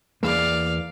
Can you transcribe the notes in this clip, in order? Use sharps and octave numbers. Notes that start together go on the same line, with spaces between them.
E2 A#3 D5 F5